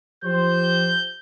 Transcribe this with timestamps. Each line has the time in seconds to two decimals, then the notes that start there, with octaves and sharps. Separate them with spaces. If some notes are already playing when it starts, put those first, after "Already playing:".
0.24 F3 G4 C5 G6